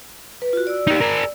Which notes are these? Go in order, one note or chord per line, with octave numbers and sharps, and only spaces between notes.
B4
F4 F#4
D5 E6
D#4 G4
G#4 A#4